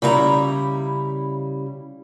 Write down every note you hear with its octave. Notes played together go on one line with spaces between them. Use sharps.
C#3 G3 E4 F5 A#5